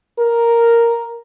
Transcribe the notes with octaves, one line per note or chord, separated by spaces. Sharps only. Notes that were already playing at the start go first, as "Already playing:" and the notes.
A#4